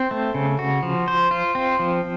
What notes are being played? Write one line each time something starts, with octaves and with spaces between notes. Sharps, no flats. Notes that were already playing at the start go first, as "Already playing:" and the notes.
Already playing: C4
A3
C#3
F#4
F3
C5
F4
C4
F3